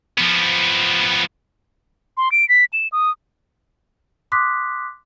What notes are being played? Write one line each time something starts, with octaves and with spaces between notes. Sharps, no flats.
F3 B3
C6
D7
B6
E7
D#6
C6 D6 D#6 F#6 B6